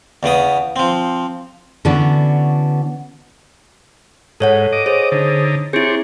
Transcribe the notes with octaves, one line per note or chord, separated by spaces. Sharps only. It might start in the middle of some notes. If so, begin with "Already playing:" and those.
E2 C#3 B3 D#6
F3 C4
D3 E3 B3 C#4 D4 F#4
G#2 A4 C#5 F#5
D#5 D6
G#4 C5 C#5
D3 D#4
C4 E4 G4 G#4 C#5